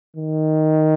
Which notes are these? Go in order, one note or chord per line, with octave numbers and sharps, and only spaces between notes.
D#3